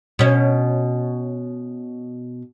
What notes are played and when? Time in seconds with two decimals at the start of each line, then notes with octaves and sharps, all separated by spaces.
0.19 B2 C#4